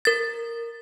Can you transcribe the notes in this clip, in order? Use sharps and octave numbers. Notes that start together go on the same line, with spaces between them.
A#4 A6